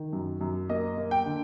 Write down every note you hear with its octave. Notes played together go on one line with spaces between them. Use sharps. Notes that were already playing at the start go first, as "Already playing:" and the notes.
Already playing: D#3
F#2
F#2
A#3 D#5
A#3
G5
D3